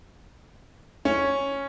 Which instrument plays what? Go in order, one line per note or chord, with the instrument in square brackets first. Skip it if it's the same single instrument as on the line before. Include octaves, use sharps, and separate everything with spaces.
[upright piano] C#4